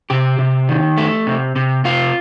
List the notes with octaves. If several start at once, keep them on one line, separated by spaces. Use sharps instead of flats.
C3 G4
C3
D#3
A3
C3
C3
C3 F4